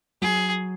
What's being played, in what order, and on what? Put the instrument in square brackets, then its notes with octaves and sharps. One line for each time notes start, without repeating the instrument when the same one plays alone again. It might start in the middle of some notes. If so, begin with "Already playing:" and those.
[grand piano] F#3 [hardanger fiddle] G#4